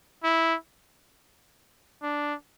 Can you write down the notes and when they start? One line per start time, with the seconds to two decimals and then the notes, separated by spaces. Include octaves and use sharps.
0.24 E4
2.03 D4